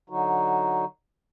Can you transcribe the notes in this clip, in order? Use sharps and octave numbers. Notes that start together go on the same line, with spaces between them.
D3 F#3 D#4 F#4